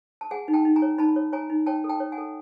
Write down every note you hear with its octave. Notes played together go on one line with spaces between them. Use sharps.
A5
G#4 F#5 G#5
D#4
G5 A5
D#4
G#5 A#5
C#5
D#4 A5 B5
C#5
C#5 G#5 A#5
D#4
C#5 G5 A5
A4
G5 A5
C#5
F#5 G#5
A4